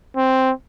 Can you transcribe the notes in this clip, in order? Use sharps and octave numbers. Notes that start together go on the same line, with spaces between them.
C4